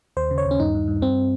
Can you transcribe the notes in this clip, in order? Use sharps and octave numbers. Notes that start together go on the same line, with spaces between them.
D#2 C5
C#3
C#5
D#2
C#4
G2 D#4
G2
G2
G2 C4